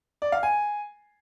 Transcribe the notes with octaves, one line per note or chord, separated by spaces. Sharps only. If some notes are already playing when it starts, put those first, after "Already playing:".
D5
F5
G#5